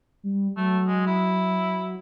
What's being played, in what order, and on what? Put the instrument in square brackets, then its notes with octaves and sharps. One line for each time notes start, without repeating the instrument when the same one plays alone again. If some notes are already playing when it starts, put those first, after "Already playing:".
[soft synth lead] G3
[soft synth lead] F#3 [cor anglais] A3
[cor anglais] G#3
E4